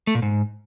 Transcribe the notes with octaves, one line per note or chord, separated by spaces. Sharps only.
A3
A#2
G#2